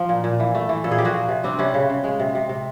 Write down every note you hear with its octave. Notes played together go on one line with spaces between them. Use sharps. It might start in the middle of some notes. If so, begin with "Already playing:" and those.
Already playing: F3
A#2
A#2
E3
A3
E3
A#2 A4
G#4
F3 G4
F#4 G#4
A#2
C3
G3 C4 D4
C3 B3 C#4
C#3
C#3
G#3
C3
C3
C3